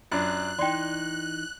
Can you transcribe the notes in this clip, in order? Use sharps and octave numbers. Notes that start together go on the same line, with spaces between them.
F#2 D4 F4 F#6
E3 D#4 D5 G5 C6